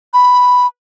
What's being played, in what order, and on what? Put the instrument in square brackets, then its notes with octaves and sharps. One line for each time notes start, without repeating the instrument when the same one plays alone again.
[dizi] B5